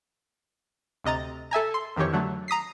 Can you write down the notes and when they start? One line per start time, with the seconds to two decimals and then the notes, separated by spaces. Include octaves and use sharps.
1.04 D2 C3 D#5 A#5 A6
1.51 A4 E5 G#5 A#5
1.74 C6
1.96 F2 D#3 E3 G4 C#5
2.13 D3 F#3 A3
2.48 A#5 D#6 B6 C7